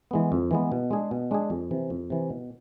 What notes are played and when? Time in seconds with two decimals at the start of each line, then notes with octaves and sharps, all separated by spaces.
0.11 E3 G#3 B3
0.32 F2
0.51 E3 G#3 B3
0.72 B2
0.91 G#3 D4 G#4
1.11 B2
1.31 G#3 D4 G#4
1.50 F2
1.71 C3 E3
1.90 F2
2.10 C3 E3
2.30 B2